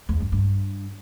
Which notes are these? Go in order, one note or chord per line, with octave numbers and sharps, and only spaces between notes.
E2
G2
G2